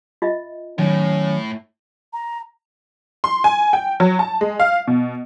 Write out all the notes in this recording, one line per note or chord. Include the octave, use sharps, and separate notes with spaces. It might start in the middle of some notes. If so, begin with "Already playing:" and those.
F4 D#5 E5
A2 D#3 F#3 C#4
A#5
C6
G#5
G5
F#3
A5
G#3
F5
B2